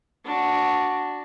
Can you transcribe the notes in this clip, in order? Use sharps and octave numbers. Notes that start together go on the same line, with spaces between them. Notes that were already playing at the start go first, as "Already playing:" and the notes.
D4 F#4